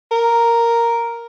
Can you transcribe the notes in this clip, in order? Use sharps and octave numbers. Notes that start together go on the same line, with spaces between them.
A#4